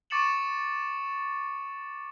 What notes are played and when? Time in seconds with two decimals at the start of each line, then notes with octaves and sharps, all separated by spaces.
0.10 C#6 D6 A6 C#7 E7 F#7